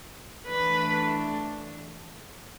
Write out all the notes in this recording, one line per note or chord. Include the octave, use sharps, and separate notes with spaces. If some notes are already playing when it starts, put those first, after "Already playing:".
E3 A3 D4 B4